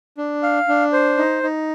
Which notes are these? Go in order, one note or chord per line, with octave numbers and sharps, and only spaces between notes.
D4
F5
D4
C5
D#4
D#4